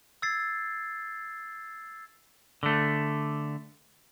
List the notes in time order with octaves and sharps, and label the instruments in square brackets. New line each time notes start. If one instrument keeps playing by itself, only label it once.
[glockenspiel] E6 G#6 A6 C7
[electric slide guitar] D3 A3